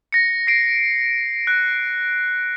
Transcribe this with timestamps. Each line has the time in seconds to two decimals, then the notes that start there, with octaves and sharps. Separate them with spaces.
0.12 A#6 C#7
0.47 C7 D7
1.47 F#6